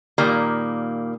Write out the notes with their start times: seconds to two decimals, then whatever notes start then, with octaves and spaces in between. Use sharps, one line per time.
0.18 A#2 D#3 G3 A#3